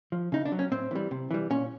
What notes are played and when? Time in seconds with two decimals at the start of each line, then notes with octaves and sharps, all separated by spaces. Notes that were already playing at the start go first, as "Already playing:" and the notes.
0.12 F3
0.32 C#3 D#4
0.45 D4
0.52 F#3
0.59 C#4
0.72 A2 C4
0.91 E3 G3
1.11 C3
1.31 E3 G3
1.50 A#2 C#4